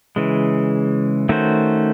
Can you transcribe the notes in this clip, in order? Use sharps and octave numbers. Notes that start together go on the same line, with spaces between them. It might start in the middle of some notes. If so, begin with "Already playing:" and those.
C#3 E3 G#3
D#3 A3 C#4 F#4 C5